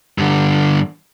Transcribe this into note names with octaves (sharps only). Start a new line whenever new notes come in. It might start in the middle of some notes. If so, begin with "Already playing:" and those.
G2 D3